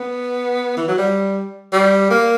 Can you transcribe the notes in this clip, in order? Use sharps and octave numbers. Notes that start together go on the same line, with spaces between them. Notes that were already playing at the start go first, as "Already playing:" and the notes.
Already playing: B3
E3
F#3
G3
G3
A#3